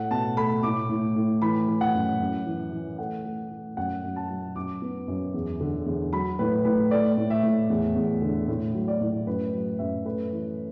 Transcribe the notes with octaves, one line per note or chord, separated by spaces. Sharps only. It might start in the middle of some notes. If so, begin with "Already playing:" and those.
Already playing: A2 A3 F#5
B2 A5
A3 B5
A2 D6
A2
A2
E3 B5
E3
F#5
F#2
F#2
E3
E3
A3 F#5
A3
A3
F#2 F#5
F#2
A5
F#3
F#2 D6
B3
F#2
E2
D3
E2
F#3 B5
A2 B4
A2 B4
A3 D5
A2
E5
A2
E2
E2
D3
A2
F#3
D5
A2
F#2 B4
F#3
F#2 E5
A3 B4
E3